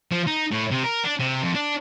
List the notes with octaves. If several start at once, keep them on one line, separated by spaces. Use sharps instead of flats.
F3
D#4
A2
C3
A#4
D4
C3
F2
D4